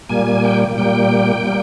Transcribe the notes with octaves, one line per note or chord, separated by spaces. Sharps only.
A#2 G3 A#3 G#5
G#5
G5
A#2 G3 A#3 G5
G3 A#3